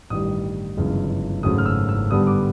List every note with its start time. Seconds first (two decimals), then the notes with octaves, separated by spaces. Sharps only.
0.10 A1 G2 D#3 G3 D#6
0.77 G1 F#2 C#3 E3 G#3
1.43 G#1 F#2 C#3 F#3 A3 D#6
1.58 F6
1.66 E6
1.89 E6
2.11 G2 D3 G3 B3 D#6
2.27 D6